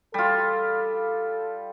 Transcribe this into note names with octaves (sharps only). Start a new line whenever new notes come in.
G3 F4 A4